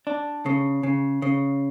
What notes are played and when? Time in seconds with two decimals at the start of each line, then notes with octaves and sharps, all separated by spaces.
0.07 D4
0.46 C#3
0.83 C#3
1.22 C#3